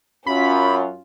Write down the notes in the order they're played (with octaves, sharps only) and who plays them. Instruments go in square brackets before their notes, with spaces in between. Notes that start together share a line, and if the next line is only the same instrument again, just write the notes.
[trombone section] F#2 [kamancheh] C#4 F4 [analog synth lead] B5